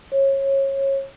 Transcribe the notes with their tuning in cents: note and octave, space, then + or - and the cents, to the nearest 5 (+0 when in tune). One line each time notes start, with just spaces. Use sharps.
C#5 -25